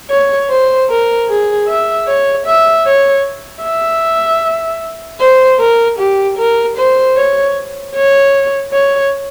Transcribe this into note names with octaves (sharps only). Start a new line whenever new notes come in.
C#5
C5
A#4
G#4
E5
C#5
E5
C#5
E5
C5
A#4
G4
A#4
C5
C#5
C#5
C#5